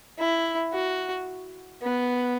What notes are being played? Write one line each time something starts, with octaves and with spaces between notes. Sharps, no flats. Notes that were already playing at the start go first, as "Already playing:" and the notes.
E4
F#4
B3